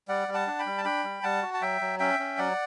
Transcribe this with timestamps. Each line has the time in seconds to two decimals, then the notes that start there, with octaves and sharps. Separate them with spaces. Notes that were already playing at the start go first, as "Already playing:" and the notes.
0.08 G3 D5 F#5
0.28 G3
0.34 F#5 A5
0.47 D4
0.59 G5 B5
0.66 G3
0.78 A5
0.85 D4 G5 B5
1.04 G3
1.23 G3 F#5 A5
1.43 F#4
1.54 A5
1.62 F#3 E5 G5
1.81 F#3
1.99 C#4 E5 G5
2.19 C#4
2.38 F#3 D5 F#5